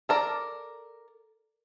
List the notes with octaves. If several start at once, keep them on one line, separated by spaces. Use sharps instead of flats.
A4 A#4 D5